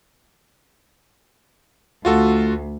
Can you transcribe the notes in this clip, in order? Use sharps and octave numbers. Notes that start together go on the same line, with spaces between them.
D2 F4 F#4 A4